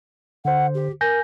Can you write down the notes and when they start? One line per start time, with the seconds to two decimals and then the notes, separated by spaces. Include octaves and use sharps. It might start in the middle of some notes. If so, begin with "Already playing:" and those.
0.45 D3 C5 F#5
0.74 G4
1.01 A#4 G#5 G6 A#6